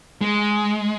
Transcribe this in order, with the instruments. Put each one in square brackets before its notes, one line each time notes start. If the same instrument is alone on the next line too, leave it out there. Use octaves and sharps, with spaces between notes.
[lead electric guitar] G#3